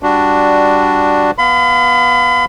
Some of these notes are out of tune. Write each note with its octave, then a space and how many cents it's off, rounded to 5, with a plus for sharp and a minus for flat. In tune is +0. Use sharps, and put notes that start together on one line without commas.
G3 +0 D4 +0 F#4 +0
B3 -15 F5 +0 B5 +40